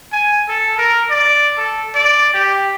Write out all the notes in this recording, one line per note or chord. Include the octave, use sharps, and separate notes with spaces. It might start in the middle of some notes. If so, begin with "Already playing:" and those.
G#5
A4
A#4
D5
A4
D5
G4